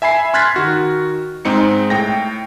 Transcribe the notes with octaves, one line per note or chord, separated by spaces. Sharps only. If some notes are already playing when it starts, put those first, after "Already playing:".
E5 G#5 B5 C7
C6 F6 F#6 G#6 A6 B6
D#3 F#4
G#2 G#3 C4 D#4 C#7
A2 G5 A#6